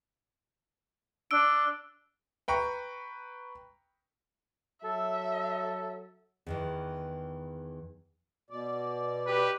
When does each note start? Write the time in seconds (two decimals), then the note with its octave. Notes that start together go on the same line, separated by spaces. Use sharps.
1.31 D4 E6 D7
2.48 B4 G5 A#5 C#6
4.84 F#3 A4 E5
6.47 E2 D#3 E3
8.50 B2 D5
9.25 G4 B4